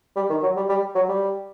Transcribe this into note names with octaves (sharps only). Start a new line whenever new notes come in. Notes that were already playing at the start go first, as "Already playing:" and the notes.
G3
D#3
F#3
G3
G3
F#3
G3